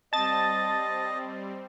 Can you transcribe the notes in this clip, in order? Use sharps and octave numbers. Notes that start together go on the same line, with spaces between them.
G3 C4 D#5 A5 A6